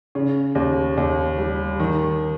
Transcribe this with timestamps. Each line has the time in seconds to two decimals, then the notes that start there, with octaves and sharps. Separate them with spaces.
0.15 C#3
0.55 D#2
0.97 D#2
1.38 G3
1.80 D#3